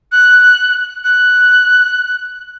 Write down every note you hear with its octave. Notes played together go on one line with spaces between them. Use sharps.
F#6
F#6